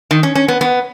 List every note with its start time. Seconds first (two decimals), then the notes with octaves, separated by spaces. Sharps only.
0.11 D#3
0.23 C#4
0.35 C#4
0.48 B3
0.61 B3